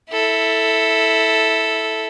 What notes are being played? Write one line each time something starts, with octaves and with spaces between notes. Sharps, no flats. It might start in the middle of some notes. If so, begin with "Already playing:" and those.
E4 A4